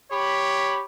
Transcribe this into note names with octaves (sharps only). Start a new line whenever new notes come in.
G4 C#5 B5